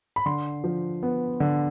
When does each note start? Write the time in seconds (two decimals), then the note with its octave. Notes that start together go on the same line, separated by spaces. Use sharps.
0.16 B5
0.26 D3 C6
0.64 F3
1.03 B3
1.40 D3